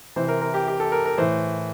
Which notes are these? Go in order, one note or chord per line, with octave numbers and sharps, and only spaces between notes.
C3 E3 C5
A#4
A#4
G4
G4
A4
A#4
A#4
A2 E3 C5